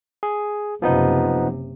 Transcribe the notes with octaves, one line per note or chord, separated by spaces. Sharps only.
G#4
F#1 C3 F3 B3 D#4